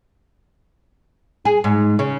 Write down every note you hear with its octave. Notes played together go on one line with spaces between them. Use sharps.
G#4
G#2
C#3